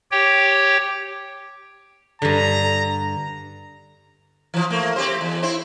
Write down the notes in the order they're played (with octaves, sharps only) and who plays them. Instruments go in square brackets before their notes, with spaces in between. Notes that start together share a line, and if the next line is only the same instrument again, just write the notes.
[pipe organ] G4 C#5 G5
[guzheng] G2 D3 [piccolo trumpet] A#5
[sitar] E3 F3
A3 A#3
C4 G4 C5
E2
C4 E4 C5